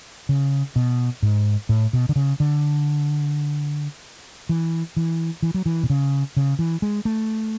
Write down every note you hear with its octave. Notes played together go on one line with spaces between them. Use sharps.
C#3
B2
G#2
A2
B2
D3
C#3
D3
E3
E3
E3
F#3
E3
B2
C#3
C#3
E3
G#3
A3